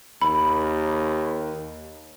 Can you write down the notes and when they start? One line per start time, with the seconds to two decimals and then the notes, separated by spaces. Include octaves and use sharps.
0.22 D#2 B5